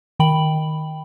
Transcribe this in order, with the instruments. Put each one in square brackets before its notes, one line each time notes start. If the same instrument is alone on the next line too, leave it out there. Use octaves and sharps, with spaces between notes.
[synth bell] D#3 G5 B5 F#7